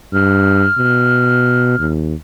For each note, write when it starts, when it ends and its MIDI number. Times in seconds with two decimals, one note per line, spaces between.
0.13 0.65 43
0.13 1.86 89
0.78 1.78 47
1.79 2.15 39